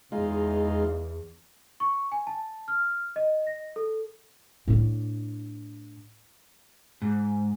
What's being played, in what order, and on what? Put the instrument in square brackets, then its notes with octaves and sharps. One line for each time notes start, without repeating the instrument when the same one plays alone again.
[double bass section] E2 [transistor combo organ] G#3 D#4 F4
[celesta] C#6
G#5
A5
F6
D#5
A#6
A4
[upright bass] A2 D4
[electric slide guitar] G#2